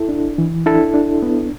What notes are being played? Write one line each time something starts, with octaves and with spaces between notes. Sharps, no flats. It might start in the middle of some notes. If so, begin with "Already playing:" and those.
Already playing: E4 A4
D4
E3
D4 E4 A4
D4
B3